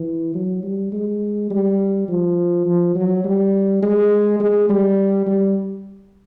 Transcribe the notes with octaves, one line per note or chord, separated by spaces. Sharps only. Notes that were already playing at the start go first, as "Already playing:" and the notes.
Already playing: E3
F#3
G3
G#3
G3
F3
F3
F#3
G3
G#3
G#3
G3
G3